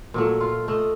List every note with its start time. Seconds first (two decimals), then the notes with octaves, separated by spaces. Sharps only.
0.14 A#2 F#3 A3
0.40 F4
0.68 A3 D#5